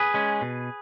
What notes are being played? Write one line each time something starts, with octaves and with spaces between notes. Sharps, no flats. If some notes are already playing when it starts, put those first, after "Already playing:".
Already playing: G#4 B4
G#3 C#4
B2